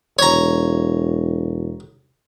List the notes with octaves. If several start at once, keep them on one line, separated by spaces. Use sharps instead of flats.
E1 C#5 A#5